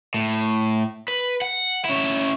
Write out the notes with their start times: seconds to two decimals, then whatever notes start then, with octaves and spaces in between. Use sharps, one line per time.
0.14 A2
1.08 B4
1.42 F#5
1.85 C#4 E4